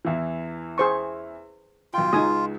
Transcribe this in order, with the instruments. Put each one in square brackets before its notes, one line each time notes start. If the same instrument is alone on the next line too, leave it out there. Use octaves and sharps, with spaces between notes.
[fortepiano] E2 E3
[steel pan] G#4 C5 C#6
[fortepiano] B1 G5 [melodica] F4
[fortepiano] C#2 G#3 [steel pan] D#4 G#5 D#6